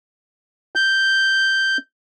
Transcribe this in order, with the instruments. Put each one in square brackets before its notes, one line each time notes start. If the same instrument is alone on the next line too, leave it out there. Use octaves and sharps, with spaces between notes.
[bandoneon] G6